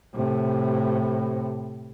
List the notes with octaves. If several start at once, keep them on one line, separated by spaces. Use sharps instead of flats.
A2 C3